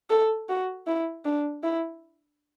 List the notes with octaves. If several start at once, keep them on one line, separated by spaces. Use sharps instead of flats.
A4
F#4
E4
D4
E4